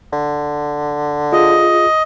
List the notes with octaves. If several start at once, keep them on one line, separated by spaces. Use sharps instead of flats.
D3
F4 G#4 D#5